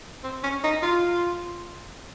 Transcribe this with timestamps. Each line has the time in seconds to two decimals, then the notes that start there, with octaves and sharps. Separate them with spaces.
0.23 C4
0.43 C#4
0.63 D#4
0.82 F4